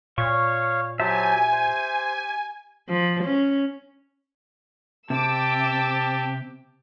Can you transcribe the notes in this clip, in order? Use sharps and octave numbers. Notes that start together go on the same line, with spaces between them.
A#2 C#5 F5 C#6
F#3 G4 C5 E5 G#5 A5
C5
F3
C#4
C3 G4 A5 D6 E6